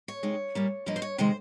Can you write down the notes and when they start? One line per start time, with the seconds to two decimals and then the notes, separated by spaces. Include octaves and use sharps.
0.08 C#5
0.23 C3 D#3 G#3
0.55 A#2 G3 A#3
0.86 G2 F3 A#3 D#5
0.96 C5
1.02 C#5
1.18 C3 D#3 G#3 C5